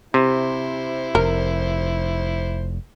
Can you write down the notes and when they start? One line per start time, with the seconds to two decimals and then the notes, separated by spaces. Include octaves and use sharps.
0.14 C3 E4 C5
1.15 F1 A#4